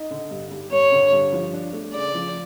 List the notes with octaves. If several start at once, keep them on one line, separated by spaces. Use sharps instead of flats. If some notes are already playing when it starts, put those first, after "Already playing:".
Already playing: D#4
D3
G2
G3
G2 C#5
D3
G2
F3
D4
A3
C#3 D5
F3